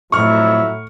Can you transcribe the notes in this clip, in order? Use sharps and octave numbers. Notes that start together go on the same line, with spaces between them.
F2 A2 F#3 E4 C#6 F6